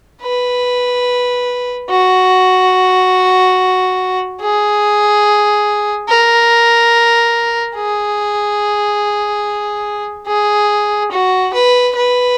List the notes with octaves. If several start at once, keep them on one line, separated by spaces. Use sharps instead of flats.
B4
F#4
G#4
A#4
G#4
G#4
F#4
B4
B4